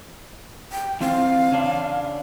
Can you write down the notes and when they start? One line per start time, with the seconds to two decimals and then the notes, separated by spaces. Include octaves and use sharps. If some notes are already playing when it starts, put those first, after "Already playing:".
0.72 G5
1.01 E3 C4 C5 F5
1.51 C#3 C#4 D4